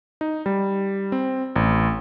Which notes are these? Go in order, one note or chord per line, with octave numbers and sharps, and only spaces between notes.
D#4
G3
C4
A1